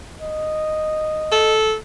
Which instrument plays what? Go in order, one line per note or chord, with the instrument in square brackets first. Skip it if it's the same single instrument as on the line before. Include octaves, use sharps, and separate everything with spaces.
[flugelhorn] D#5
[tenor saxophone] A4